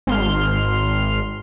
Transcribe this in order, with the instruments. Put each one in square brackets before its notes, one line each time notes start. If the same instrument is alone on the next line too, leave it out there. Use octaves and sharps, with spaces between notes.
[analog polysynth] G#1 C6 F6